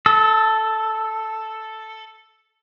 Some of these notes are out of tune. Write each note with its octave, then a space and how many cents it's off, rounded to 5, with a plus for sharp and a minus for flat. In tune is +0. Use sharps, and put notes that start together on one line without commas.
A4 +0 E6 -35